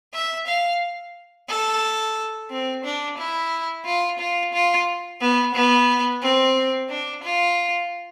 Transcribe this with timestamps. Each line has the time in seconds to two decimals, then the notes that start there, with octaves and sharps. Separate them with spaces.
0.14 E5
0.47 F5
1.49 A4
2.50 C4
2.84 D4
3.18 E4
3.85 F4
4.19 F4
4.53 F4
5.21 B3
5.54 B3
6.22 C4
6.90 D4
7.24 F4